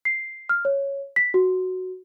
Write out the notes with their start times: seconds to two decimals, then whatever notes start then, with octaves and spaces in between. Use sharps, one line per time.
0.05 C7
0.49 F6
0.65 C#5
1.16 B6
1.34 F#4